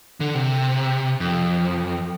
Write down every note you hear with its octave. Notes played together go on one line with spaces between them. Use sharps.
D3
C3
F2